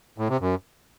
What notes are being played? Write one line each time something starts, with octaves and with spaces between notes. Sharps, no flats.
A2
C3
F#2